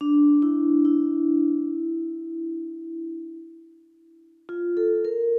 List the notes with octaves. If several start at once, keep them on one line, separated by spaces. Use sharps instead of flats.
D4
E4
E4
F4
A4
A#4